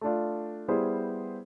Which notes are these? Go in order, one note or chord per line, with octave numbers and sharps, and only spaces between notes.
A3 D4 F4
G3 B3 E4 G#4 C5